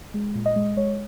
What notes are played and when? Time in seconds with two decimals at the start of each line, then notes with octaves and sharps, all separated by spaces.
0.14 G#3
0.35 A#2
0.46 D#5
0.56 G#3
0.77 G#3 C#5